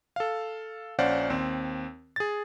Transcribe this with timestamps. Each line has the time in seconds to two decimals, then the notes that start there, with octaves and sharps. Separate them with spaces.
0.16 A4 F5
0.99 A#1 C#4 C5 D5 F5 F#5
1.30 D#2 C4
2.16 G#4 A6